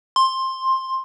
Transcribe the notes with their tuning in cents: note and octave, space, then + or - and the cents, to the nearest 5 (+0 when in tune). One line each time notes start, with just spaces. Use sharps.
C6 +10